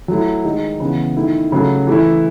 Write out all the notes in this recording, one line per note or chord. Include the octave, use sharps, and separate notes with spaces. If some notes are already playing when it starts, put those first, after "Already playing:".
F#3 A3 E4
D#3 G#3 D#4
C#3 E3 B3
D#3 A3 E4
C#3 F#3 A3
E3 A3 E4